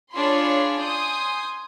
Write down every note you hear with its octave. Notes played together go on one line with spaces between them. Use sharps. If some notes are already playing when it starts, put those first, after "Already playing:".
D4 F4 G#4 C#5 B5 C6
G#5 C6 D#6 G6